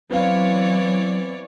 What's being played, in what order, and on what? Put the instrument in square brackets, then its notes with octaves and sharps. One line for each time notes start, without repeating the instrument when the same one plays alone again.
[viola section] E3 C#5 D5 [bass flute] F#3 [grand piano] B3 C4 F5